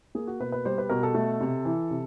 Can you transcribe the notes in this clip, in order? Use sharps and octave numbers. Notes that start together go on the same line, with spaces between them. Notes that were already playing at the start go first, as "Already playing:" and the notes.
A#3 G#4
F#4
B2 B4
B4
G3 C5
B4
B2 A#4
A4
A3
C3
E3
C3